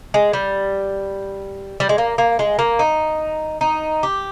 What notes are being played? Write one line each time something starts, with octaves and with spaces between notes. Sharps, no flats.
G#3
G3
G3
G#3
A#3
A#3
G#3
A#3
D#4
D#4
G4